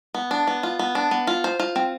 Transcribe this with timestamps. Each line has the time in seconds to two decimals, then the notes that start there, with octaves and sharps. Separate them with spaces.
0.14 B3
0.31 D4
0.47 B3
0.63 F4
0.79 B3
0.95 D4
1.11 B3
1.27 F4
1.44 C5
1.60 F4
1.76 C4